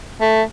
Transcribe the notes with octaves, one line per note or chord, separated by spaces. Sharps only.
A3